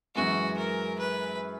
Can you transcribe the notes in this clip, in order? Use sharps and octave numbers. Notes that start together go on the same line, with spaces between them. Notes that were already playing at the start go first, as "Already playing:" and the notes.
F#2 E3 G#3 F#4
A#4
B4